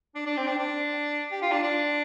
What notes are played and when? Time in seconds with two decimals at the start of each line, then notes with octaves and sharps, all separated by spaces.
0.15 D4
0.26 D4
0.37 C4
0.47 D4
0.58 D4
1.32 G4
1.42 F4
1.52 D4
1.63 D4